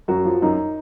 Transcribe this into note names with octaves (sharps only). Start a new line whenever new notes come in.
F#2 F#4
F3
F#2 D#4